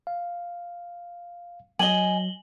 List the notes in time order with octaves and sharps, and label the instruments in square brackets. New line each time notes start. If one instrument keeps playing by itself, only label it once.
[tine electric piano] F5
[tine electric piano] F#3 [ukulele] D#5 G#5 [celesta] F#7 G7